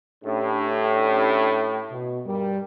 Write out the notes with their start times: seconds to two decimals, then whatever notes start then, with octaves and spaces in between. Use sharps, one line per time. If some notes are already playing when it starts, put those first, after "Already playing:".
0.24 A2 C#4 D4 G4
1.91 B2
2.26 G2 G3 A#4